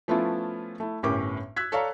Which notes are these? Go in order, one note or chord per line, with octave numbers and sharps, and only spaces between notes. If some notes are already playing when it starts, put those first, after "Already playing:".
F3 A3 B3 C#4 E4 F4
A3 E4
G1 A2 C#4 G4 A#4 D6
E6 F#6 G#6 B6
A4 C#5 D5 F5 A#5